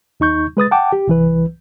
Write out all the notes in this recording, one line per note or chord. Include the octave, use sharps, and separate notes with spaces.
D#2 D#4 C#6 G6
G#3 B4 D#6 A6
F#5 G5 A5 D6
G4
C2 E3 B4